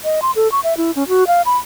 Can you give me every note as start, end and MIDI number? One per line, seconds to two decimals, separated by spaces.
0.04 0.20 75
0.22 0.31 84
0.36 0.50 69
0.52 0.60 85
0.63 0.76 76
0.77 0.91 64
0.96 1.07 61
1.08 1.27 66
1.27 1.42 77
1.45 1.57 83